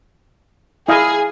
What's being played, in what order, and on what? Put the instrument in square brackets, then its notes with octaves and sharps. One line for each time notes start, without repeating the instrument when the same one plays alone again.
[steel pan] E4 D#5 F5 [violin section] G#4